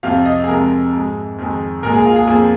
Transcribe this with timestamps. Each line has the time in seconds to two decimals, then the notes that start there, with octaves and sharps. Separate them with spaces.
0.03 F2 C3 F3 F5
0.25 D#5
0.44 G#4
0.48 F2 C3 G#3 A#4
0.93 G#2 G#3
1.38 F2 D#3 G#3
1.83 A#2 G#3 A#4
1.94 G#4
2.05 F4
2.16 G#4
2.27 F2 F3 A#3 G#4